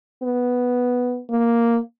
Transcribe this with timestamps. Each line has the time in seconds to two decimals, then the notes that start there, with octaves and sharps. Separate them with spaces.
0.23 B3
1.30 A#3